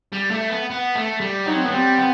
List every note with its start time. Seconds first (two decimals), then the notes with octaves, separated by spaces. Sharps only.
0.13 G3
0.31 A3
0.50 B3
0.70 B3
0.95 A3
1.21 G3
1.46 F#3 D#4
1.54 C4
1.64 A3 B3
1.71 G3 C4
1.98 B3